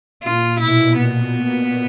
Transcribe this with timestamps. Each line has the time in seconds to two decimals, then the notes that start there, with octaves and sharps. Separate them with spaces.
0.23 A#2 F4
0.60 B2 E4
0.97 A#2 B3